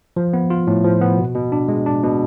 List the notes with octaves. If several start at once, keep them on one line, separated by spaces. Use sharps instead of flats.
F3
B3
F4
A2
F3
B3
B2
B2
D4
G#3
D4
B2